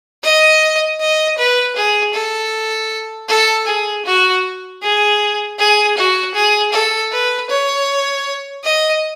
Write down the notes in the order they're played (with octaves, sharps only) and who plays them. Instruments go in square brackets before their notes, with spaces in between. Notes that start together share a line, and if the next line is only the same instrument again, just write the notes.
[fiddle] D#5
D#5
B4
G#4
A4
A4
G#4
F#4
G#4
G#4
F#4
G#4
A4
B4
C#5
D#5